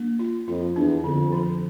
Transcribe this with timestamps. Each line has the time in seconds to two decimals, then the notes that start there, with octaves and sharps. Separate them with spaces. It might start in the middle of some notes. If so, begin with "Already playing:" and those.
Already playing: A#3 D4
0.19 F4
0.48 F2 F4
0.76 E2 D4
1.04 F2 D3
1.32 F3